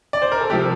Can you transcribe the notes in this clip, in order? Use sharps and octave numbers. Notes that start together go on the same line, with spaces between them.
D5
C5
A#4
A4
C3 F3 G4